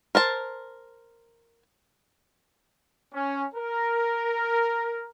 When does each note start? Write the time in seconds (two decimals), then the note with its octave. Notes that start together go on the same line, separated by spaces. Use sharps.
0.15 A#4 C5 A5
3.14 C#4
3.55 A#4